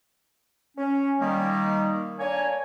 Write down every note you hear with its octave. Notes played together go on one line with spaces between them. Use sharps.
C#4
D#3 G3 A#3
A#3 D4 C#5 G#5